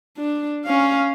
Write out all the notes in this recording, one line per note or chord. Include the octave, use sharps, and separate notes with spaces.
D4
C#4 F5